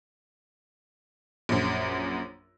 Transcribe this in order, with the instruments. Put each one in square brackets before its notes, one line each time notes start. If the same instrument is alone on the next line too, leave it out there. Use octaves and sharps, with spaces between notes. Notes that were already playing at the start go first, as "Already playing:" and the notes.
[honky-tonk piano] A#1 F#2